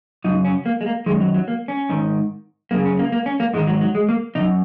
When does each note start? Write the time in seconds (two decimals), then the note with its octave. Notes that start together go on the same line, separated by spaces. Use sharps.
0.24 F#2 C#3 D#4
0.45 C#4
0.66 A#3
0.81 G#3
0.86 A#3
1.06 F#2 D#3 G#3
1.20 F#3
1.34 F#3
1.48 A#3
1.68 C#4
1.89 G#2 D#3
2.71 F#2 C#3 A#3
2.85 C#4
2.99 A#3
3.12 A#3
3.26 C#4
3.40 A#3
3.54 G#2 D#3 G#3
3.67 F#3
3.81 F#3
3.95 G#3
4.09 A#3
4.35 C#3 D#4
4.39 F#2